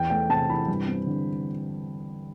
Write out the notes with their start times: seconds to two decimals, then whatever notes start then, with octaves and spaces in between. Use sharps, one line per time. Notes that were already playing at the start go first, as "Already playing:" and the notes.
Already playing: E2 G5
0.10 A3 G5
0.29 C3 A5
0.49 E3 B5
0.68 G2
0.88 C4
1.07 D3